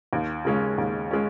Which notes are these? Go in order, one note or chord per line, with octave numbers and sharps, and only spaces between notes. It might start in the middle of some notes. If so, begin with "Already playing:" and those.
D#2
C#3 G#3 C#4
D#2
G#3 C#4